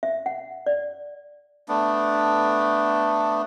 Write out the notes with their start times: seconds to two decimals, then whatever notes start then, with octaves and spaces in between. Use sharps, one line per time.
0.03 E5
0.26 F#5
0.66 D5
1.68 A3 B3 D4